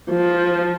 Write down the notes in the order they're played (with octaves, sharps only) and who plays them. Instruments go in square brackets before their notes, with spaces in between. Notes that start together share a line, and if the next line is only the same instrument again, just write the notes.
[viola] F3